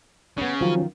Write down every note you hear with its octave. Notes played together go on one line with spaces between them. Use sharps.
C#3 B3 C#4 D4
D#3 F3 F#3 C#4 F4